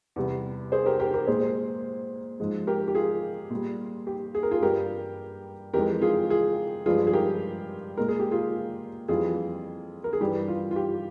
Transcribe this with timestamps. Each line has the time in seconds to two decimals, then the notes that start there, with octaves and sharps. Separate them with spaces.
0.16 E2 C3 G3
0.72 G#4 C5
0.86 G4 A#4
0.99 G4 A#4
1.14 G4 A#4
1.27 A#2 G#3 G#4 C5
2.40 G#2 F3 G#3
2.67 G4 A#4
2.88 G4
2.95 F4 G#4
3.50 A#2 G3
4.07 G4
4.35 G#4
4.43 A#4
4.51 F4 G#4
4.62 G2 G3 G4 A#4
5.74 F2 E3 G#3 G4 A#4
6.02 F4 G#4
6.30 F4 G#4
6.86 G2 F3 G#3 F4 G#4
7.07 G#4
7.13 G4 A#4
7.97 A#2 G#3 A#4
8.09 G#4
8.20 G4
8.31 F4 G#4
9.08 F2 E3 G3 F4 G#4
10.04 A#4
10.13 G#4
10.21 G2 E3 G3 G4
10.48 F4
10.71 F4
10.76 G4